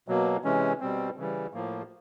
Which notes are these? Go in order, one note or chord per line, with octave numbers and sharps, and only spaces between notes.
B2 F#3 A#3
C3 E3 G#3 C#4
B2 G3 C4
C#3 E3 G3
A2 F3 A#3